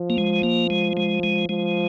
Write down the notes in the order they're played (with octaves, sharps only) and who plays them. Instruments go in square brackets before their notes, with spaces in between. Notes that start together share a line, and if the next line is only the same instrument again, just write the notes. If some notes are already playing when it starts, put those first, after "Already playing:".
Already playing: [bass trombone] F3
[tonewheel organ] A#3
G#3
A#3
G#3
G#3
G#3
[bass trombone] F3 [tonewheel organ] G#3